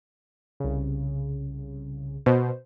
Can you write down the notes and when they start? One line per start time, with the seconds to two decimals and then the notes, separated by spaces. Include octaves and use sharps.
0.60 C2 C#3
2.26 B2 C5